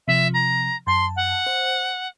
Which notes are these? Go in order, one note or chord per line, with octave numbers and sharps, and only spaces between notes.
C3 F3 E5
A#5
F#2 A5 C6
F#5
C5